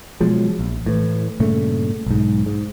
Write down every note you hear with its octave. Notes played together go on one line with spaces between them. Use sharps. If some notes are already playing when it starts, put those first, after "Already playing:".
B2 F3 F#3 G#3
A#1
A2 E3
G2 A#2 C#3 A3
B1 G#2
G#2